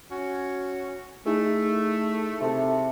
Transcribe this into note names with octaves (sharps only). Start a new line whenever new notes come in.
C#4 F#4
A3 D#4 E4 G#4
C3 A3 A4